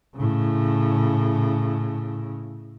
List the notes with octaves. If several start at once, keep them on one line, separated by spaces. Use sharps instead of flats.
A2 C#3